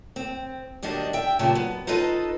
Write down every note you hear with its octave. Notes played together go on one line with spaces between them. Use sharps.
C4
D#2 B2 G3 D4 D#5
E5 G5
G2 A#2 C#3 G3 A3 A5
F#3 B3
D#4 F4 A4 B4 D#5